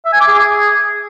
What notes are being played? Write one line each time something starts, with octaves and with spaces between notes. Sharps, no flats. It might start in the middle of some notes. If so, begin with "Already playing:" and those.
E5
G#5
D6
G#4